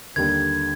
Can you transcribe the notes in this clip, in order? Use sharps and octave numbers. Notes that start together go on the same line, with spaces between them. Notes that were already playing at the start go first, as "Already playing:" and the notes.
D#2 D3 G3 A#3 G#6